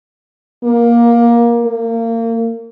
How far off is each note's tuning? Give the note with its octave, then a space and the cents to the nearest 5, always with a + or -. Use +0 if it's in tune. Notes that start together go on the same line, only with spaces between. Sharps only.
A#3 +15
A#3 -30